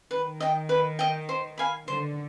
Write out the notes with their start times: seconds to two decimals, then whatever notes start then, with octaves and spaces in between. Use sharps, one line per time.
0.11 D#3 B4
0.40 D#5 G5
0.69 B4
0.99 D#5 G5
1.29 C5
1.58 F5 G#5 B5
1.88 D3 C5